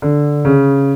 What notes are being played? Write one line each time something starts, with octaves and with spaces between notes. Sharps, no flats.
D3
C#3